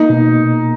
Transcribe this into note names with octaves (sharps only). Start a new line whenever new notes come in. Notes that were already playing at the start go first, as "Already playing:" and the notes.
Already playing: A#3 D#4
B2